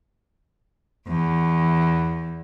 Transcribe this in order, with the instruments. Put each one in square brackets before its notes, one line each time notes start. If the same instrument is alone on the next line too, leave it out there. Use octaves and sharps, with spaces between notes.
[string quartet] E2